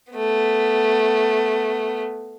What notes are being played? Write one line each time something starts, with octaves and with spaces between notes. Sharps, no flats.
A3 B3